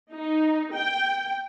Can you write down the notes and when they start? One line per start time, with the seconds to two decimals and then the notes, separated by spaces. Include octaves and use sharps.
0.12 D#4
0.73 G5